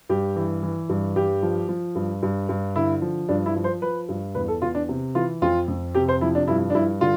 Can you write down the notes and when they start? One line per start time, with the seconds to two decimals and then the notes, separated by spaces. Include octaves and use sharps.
0.09 G2 G4
0.36 E3
0.63 E3
0.89 G2
1.16 G2 G4
1.43 F3
1.69 F3
1.95 G2
2.23 G2
2.49 G2
2.76 D3 E4
3.02 F3
3.29 G2 D4
3.46 E4
3.56 F3
3.64 C5
3.82 F3 B4
4.09 G2
4.35 E2 B4
4.48 A4
4.62 E2 F4
4.75 D4
4.89 C3
5.14 E3 F4
5.42 F2 F4
5.68 F2
5.95 C3 G4
6.08 C5
6.21 F3 E4
6.35 D4
6.47 G2 E4
6.70 D4
6.75 G2 E4
7.01 D3 F4